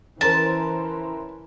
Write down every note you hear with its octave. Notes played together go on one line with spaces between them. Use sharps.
E3 C#4 A#4 C5 A5